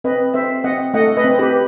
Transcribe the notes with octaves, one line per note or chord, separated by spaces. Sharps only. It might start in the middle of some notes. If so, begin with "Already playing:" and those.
C4 B4 D#5
C4 C5 E5
C4 D#5 F#5
A3 D#5 F#5
B4 D#5
C4
G4 B4